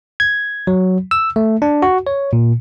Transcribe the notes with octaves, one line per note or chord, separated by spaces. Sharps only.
G#6
F#3
E6
A3
D4
F#4
C#5
A#2